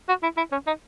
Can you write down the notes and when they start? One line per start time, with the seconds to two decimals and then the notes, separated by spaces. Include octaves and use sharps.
0.09 F#4
0.23 E4
0.37 E4
0.52 C#4
0.67 D#4